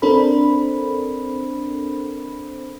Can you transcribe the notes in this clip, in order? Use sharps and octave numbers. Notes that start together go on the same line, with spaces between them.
C4 D4 A4 A#4 C5 B5